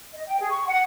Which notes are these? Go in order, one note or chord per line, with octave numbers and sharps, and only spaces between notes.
D#5
G5
G#4
C#6
F#5